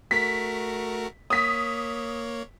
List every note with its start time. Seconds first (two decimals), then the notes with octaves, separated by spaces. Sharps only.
0.11 A3 F#4 A#4 B6
1.30 A#3 C#5 D#6 B6